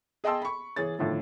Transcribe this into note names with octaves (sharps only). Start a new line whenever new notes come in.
G#4 D#5 G5 A5 C6 E6
B5 C#6
E3 G#4 C#5 A6
A2 D3 D#3 F3